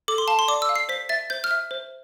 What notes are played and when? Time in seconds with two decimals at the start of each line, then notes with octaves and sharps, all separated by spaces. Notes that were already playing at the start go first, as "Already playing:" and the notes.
0.08 A4 D6
0.18 C6
0.28 F5 A5
0.39 C6
0.48 D5 D6
0.62 E6
0.69 F5
0.76 C7
0.89 C5 B6
1.09 E5 A6
1.30 C5 G6
1.44 F6
1.51 E5
1.71 C5